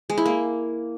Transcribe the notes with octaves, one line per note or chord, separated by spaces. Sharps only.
G#3
E4
A#3